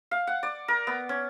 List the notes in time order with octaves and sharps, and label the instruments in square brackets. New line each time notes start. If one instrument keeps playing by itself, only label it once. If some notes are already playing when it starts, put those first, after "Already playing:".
[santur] F5
F#5
D5
A#4
B3
C#4